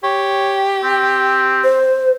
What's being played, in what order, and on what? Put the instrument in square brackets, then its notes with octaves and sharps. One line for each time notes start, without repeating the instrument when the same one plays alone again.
[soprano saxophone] G4 [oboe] C#5
[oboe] C4
[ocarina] C5